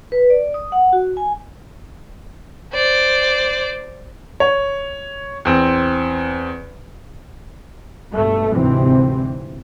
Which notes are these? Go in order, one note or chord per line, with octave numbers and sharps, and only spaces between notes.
B4
D5
D#6
F#5
F#4
G#5
C5 D5
C#5
E2 C4
G2 B2 A3
D2 G#2 C3 E3 C4